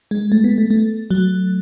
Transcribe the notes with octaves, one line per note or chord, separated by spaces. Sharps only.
G#3
A3
B3
A3
A3
F#3